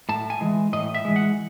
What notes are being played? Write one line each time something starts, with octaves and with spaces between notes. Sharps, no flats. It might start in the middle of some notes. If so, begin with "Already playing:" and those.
A2 A5
G#5
E3 G#3
A2 D#5
E5
E3 G#3
F#5